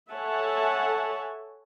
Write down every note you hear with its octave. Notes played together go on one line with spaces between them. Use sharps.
A4 C#5 E5 F#5 G#5 A5